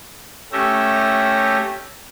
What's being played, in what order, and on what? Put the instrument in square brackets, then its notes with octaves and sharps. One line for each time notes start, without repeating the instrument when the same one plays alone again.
[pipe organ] A3 C#4 G4 E5 A#6